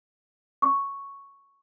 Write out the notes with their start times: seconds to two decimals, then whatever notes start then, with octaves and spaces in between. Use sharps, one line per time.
0.62 C#6